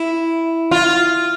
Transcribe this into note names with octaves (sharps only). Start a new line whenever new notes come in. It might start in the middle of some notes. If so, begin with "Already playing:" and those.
Already playing: E4
F4